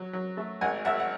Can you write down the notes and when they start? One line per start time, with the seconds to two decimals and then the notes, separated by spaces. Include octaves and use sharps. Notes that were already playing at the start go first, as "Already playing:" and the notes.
Already playing: F#3
0.13 F#3
0.37 A3
0.61 G#1 F#5 G#5
0.85 G#1 E5 F#5
1.00 F#5